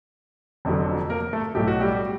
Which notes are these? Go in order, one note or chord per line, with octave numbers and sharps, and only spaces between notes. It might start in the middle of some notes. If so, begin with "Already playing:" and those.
F1 F2 D3 F#3
A#3 A#4
A3 A4
B1 A2 F#3 A3 G4
F#4
G3 G4